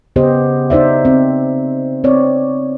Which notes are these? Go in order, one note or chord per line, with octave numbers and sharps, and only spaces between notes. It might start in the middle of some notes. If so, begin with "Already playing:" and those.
C#3 B3 G4 C5 D#5
D#4 C5 D5 E5
C4
C4 C#5 D5